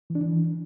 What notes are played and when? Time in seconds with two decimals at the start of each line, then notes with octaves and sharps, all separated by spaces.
0.10 E3
0.15 D4
0.21 E3